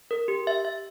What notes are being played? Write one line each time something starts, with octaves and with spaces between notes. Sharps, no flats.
A#4
G4
E5
E5